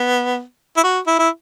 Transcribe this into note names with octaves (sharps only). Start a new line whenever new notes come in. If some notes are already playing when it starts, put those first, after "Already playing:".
Already playing: B3
E4
F#4
E4
E4